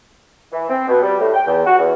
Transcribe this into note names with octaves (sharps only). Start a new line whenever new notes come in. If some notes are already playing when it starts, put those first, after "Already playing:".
E3
C4
B2
G3
A2
G5
E2
F#4
E2